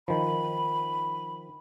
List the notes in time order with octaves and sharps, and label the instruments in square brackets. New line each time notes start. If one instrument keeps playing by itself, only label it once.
[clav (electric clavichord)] D#3 F3 [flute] B5